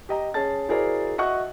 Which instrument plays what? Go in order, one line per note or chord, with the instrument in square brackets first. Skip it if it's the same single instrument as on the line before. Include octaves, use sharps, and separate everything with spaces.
[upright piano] G4 D#5 A#5
C#4 G#4 A5 A6
E4 F#4 G#4 A#4 C5 D5
F#4 D#5 E5 F#5 C#6 F#6